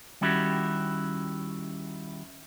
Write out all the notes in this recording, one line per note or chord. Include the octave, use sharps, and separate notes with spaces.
D#3 G3 C#4 E4 F#4 G4